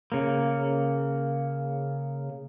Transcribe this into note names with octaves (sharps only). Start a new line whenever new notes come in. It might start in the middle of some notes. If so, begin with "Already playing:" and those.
C#3 A#3